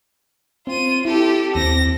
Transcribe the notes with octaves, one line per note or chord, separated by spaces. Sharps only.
C4 F4 D#7
E4 G4 A4
D#2 C4 A#6